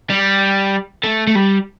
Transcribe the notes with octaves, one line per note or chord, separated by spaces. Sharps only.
G3
A3
A3
G3